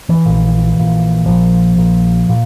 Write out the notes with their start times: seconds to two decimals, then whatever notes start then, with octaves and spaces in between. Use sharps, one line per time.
0.09 E3
0.26 A#1 A#2
0.75 A#1 A#2
1.25 A#1 A#2 F3
1.75 A#1 A#2
2.29 A#2